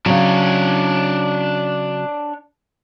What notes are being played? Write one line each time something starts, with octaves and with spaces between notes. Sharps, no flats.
C#3 F#3 D4 C#5